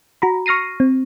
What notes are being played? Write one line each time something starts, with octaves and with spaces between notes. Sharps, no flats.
F#4 A#5 B5
C#6 F6 A#6 C7 D#7
C4